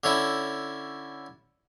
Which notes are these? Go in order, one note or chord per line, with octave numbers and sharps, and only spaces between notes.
D3 C#4 E4